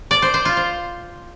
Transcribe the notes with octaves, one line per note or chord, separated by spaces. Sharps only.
D5
C5
C5
F4
C5